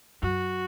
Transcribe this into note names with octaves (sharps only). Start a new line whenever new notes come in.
F#2 F#4